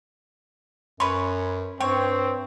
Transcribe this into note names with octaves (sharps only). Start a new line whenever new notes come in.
F#2 B4 C#5 B5 C6
G2 C4 C#5 G5